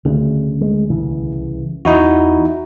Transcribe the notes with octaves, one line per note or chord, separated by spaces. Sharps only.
D2 C#3
G#3
C2 C#3 E3
E2 D#4 E4 F#4